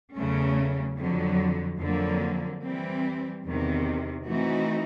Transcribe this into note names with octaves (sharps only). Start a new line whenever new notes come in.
E2 C#3 F#3 A3 C#4
F2 D3 F#3
F2 D3 F#3 A#3
E3 G3 C4
E2 C3 D#3
E3 A3 C4 D#4 F#4